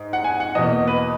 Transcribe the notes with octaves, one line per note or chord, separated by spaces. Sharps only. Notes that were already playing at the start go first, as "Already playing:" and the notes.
Already playing: G#2
F#5
G#5
F#5
E2 B2 A#3 D#5
B4